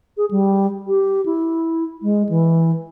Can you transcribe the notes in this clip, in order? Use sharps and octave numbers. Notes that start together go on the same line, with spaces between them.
G#4
G3
G4
E4
G#3
E3